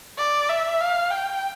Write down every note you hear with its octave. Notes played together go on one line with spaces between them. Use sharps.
D5
E5
F5
G5